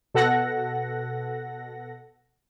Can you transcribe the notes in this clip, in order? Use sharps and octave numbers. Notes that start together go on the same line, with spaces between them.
B2 A4 F#5 A#6